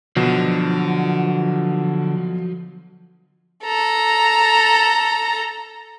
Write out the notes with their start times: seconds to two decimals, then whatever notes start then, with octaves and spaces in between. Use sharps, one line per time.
0.16 B2 D3 F3 F#3
3.64 A4 A#5